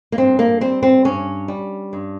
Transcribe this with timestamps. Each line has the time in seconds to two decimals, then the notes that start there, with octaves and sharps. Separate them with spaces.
0.12 A#3
0.17 G2 C4
0.39 A#3
0.61 G3 C4
0.83 C4
1.04 G2 C#4
1.48 G3
1.93 G2